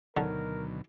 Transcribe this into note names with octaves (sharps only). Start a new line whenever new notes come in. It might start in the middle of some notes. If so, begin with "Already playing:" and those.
D2 B2 D3 D#3 F#3 D#4 A#4